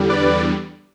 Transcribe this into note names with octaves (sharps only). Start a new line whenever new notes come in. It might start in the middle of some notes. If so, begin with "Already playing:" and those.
Already playing: E2 D3 G3
B4 D5